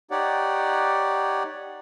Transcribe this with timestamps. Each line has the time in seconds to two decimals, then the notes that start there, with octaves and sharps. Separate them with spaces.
0.11 D#4 G4 C#5 D5 F#5